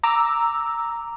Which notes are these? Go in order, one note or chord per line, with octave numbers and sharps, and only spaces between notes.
A#5 D6 E6